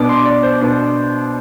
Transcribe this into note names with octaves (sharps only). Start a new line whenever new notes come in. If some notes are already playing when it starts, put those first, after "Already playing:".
Already playing: B2 B3 D4 D6
C6
D5
C5
B2 B3 D4